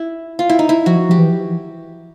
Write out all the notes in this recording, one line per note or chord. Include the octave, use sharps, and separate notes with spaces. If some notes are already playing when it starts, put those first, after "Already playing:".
Already playing: E4
F4
E4
D#4
E4
F3 F#4
F3 G4
E3